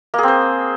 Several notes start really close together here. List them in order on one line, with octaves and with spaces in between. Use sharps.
A#3 G#4 C4 C5